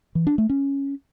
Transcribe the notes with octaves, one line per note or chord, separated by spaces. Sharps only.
E3
D4
A3
C#4